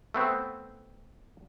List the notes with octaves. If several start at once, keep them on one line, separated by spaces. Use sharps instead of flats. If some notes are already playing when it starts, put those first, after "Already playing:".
A3 B3 C4